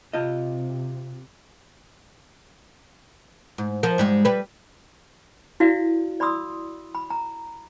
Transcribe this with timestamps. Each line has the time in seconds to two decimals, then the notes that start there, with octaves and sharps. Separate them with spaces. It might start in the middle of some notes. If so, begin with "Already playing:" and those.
0.13 C3 F4 D#5
3.58 G#2
3.83 F3 A#4
3.98 G#2 G3 G#3
4.25 G3 B4
5.60 E4 F#4 D5 F5
6.20 D5 B5 C6 D#6 E6
6.95 B5
7.10 A#5